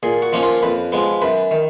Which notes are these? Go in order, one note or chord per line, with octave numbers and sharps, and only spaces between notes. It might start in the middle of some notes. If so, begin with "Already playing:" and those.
A#2 G#4
F#4
F3 A#3 C#4 D#4
F4
F2 B4
F3 G#3 B3
F#2 B4
D#3